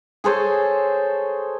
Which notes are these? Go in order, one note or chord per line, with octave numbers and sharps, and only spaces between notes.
G#4 A4 C5 C#5